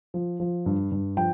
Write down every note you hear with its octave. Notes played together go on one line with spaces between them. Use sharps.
F3
F3
G2
G2
F3 G5